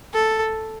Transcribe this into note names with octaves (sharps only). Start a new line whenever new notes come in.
A4